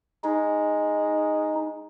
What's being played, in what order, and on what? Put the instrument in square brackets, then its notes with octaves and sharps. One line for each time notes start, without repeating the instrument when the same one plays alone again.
[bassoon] G#3 [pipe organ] D#4